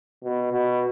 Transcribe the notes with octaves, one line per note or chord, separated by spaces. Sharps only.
B2
B2